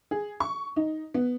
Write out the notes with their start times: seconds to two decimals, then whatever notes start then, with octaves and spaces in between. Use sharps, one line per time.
0.11 G#4
0.40 C#6
0.76 D#4
1.14 B3